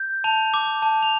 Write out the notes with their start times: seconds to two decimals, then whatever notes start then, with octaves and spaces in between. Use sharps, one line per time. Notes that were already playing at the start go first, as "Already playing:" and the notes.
Already playing: G6
0.24 A5 F7
0.54 D6
0.82 A5
1.03 F7